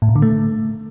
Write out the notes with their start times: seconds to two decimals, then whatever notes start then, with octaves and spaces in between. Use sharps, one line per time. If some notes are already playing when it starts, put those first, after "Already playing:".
0.02 A2
0.09 A#2
0.16 D3
0.22 A3